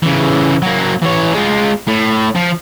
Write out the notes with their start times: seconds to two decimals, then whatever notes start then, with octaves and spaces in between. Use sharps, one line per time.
0.03 C#3 E3
0.62 F#3 A#3
1.02 E3 C#5
1.34 G#3 F4
1.87 A2
2.35 F3